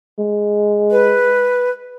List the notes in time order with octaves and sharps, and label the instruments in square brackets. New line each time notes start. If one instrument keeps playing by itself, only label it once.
[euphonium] G#3
[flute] B4